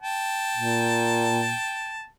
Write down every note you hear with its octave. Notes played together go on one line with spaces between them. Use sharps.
G5 A5
A#2